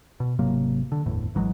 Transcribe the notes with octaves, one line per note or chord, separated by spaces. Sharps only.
B2
G#1 C3 F#3 A#3
D3
D1 G1 E2 A2
G#1 E3 F#3 G#3